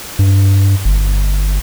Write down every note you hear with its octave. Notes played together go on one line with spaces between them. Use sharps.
G2
G1